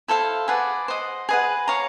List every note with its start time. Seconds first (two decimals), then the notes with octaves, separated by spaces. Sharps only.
0.08 E4 A4 C5 F5
0.48 G#4 B4 D5 F#5
0.88 C5 D#5 F#5
1.29 G#4 B4 D#5 F#5
1.68 C#5 F5 A#5